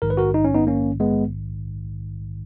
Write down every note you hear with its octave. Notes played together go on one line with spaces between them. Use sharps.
A#1 G#2 D#3 A#4
B4
F#4 A#4
D#4
C#4
B3 D#4
A#3 C#4
G#3 B3